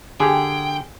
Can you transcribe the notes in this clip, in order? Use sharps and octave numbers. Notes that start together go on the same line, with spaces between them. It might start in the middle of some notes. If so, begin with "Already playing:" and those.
D3 G4 G#4 G5